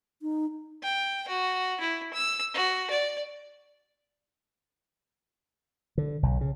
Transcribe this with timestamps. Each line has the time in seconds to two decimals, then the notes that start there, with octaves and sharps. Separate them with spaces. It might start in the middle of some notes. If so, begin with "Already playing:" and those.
0.22 D#4
0.83 G5
1.28 F#4
1.80 E4
2.14 E6
2.54 F#4
2.91 D5
5.98 D3
6.23 B1
6.41 C#3